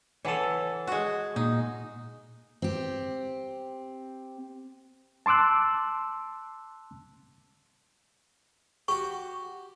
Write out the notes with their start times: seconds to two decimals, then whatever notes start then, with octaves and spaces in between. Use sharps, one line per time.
0.25 E3 A4 C#5 F#5 A5
0.87 G#3 F#4
1.36 A#2 D#4
2.62 C4 G4
5.26 A5 C6 D6 E6 F#6
8.88 F#4 G4 C#6